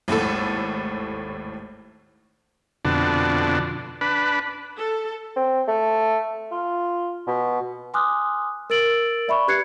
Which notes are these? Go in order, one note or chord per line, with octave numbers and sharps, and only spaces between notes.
G#1 D#2 A2 A4
F2 B2 D3 D4
D4 B4
A4
C4
A3
F4
B2
G#5 C6 D6 D#6 F6 F#6
A#4 E6 A6 D7 F#7
D5 E5 B5 C#6
G4 B4 F#6 G#6 C7 C#7